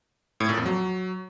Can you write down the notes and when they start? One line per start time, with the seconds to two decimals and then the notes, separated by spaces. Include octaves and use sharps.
0.40 A2
0.49 A#2
0.57 F2
0.66 F#3